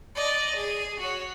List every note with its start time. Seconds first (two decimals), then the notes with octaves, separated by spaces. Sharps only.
0.15 D5 D#5
0.55 G#4
0.99 F#4 C#5